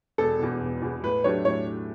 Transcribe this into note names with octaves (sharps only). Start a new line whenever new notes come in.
E1 A4
E2 B2
E1
E2 B2
A2 B4
F#3 A3 D4 G4 C#5
A2 C#5